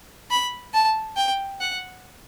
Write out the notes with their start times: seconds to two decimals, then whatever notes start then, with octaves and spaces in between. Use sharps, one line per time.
0.31 B5
0.74 A5
1.17 G5
1.61 F#5